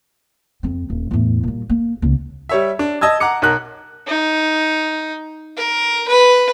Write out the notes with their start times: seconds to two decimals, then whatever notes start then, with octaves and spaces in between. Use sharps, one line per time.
0.63 F2 C4
0.90 D#1
1.11 E2 A2
1.43 A#2 G3
1.69 A#3
2.02 C#2 A#3
2.49 G3 C#5 E5
2.79 D4
3.01 D#5 A5 E6 G#6
3.20 F#5 A#5 D6 C#7
3.42 B1 A#4 F#6
4.07 D#4
5.57 A#4
6.08 B4